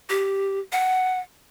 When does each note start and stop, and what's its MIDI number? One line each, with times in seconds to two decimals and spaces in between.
0.09 0.59 67
0.72 1.19 78